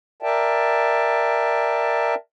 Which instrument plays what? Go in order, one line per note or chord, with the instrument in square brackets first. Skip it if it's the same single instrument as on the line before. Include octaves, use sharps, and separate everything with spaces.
[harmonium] A#4 D5 E5 G5 A5